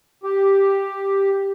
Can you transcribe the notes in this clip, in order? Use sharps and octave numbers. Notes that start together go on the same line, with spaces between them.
G4